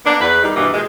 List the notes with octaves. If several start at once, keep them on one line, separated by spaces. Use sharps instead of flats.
A#3 B3 D4
E2 B4
D#3 G3
G2 B2 E3 A#3 B3
A#2 D#3 G#3